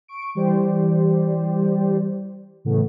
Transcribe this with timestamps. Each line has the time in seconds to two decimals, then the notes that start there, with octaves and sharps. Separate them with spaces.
0.08 C#6 D7
0.35 E3 G3 G4 C5 D5
2.65 A2 C#3 E3 A3 B3